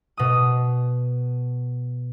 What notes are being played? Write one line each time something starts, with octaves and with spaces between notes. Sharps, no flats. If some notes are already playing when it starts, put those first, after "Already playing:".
B2 D#6